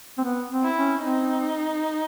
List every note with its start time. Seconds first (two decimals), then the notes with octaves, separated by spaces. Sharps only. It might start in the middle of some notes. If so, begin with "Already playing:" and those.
0.18 C4
0.24 B3
0.51 C4
0.63 E4
0.76 C#4
1.01 C4 D#4